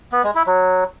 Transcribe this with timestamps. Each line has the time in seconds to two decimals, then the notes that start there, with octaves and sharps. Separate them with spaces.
0.12 B3
0.24 G#3
0.35 E4
0.46 F#3